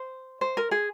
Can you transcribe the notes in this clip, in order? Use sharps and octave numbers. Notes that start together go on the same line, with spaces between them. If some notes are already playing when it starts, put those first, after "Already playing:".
Already playing: C5
C5
A#4
G#4